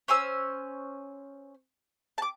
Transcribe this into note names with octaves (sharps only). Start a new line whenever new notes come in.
C#4 C5 G#5 E6
A5 D6